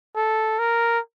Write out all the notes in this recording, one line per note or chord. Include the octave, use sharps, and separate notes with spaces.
A4
A#4